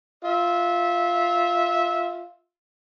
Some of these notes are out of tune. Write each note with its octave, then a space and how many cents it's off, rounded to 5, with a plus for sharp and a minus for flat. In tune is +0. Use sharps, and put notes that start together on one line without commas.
F4 +0 E5 -15